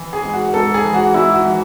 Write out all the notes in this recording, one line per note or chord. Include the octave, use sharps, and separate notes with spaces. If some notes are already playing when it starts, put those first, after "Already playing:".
Already playing: E3
G#4
G#2
F#4
G#2 A4
G#4
E3
F#4
G#2 E4
F#4
E3